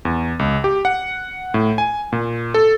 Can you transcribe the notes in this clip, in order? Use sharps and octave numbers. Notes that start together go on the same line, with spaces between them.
E2
C#2
G4
F#5
A2
G#5
A#2
A4